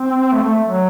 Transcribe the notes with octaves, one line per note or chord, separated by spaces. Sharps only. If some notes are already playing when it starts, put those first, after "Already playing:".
Already playing: C4
A3
A3
F#3